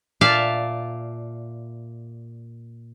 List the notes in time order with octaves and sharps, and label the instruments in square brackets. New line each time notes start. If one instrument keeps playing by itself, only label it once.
[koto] A#2 D5 E5 F5 A5